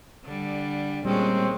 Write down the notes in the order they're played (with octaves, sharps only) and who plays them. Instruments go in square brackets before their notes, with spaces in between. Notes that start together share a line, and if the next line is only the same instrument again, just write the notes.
[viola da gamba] D3 G3
[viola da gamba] A#2 G#3 C#4 [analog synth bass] G3 [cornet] C4